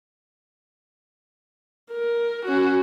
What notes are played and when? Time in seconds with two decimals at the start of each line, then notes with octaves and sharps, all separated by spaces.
1.91 A#4
2.46 C#4 F#4